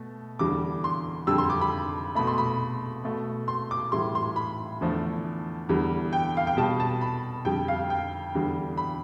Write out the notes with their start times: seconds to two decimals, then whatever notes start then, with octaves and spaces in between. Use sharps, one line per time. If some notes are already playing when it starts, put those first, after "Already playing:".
Already playing: B2 A3
0.39 E2 D3 G3 D6
0.84 C6
1.27 F2 D3 G3 E6
1.38 C6
1.50 D6
1.61 B5
2.15 B2 A3 B5
2.27 C6
2.38 B5
3.04 B2 A3
3.48 C6
3.71 D6
3.92 A2 E3 G3 C6
4.15 C6
4.36 B5
4.81 E2 D3 F3 A3
5.69 E2 D3 G3
6.13 G5
6.37 F5
6.47 G5
6.57 B2 G3 A5
6.80 A5
7.01 B5
7.45 F2 D3 G3 G5
7.68 F5
7.90 G5
8.35 E2 D3 G3
8.77 B5